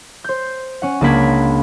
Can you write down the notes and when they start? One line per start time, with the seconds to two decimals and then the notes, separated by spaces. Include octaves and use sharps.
0.24 C5 G6
0.82 C#4 F#5
1.01 C#2 A#3 D4 B5 G#6